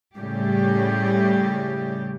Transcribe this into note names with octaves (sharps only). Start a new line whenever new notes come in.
A2 C#3 G3 G4